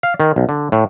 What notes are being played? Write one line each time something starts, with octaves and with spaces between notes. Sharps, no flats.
F5
D#3
B1
D3
A2